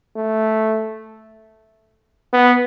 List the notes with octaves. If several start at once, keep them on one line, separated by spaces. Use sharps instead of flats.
A3
B3